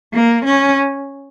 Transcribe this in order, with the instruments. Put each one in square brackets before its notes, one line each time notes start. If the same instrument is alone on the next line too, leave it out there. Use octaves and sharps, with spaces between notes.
[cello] A#3
C#4